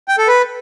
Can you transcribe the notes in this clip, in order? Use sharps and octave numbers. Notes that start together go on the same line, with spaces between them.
G5
A4
B4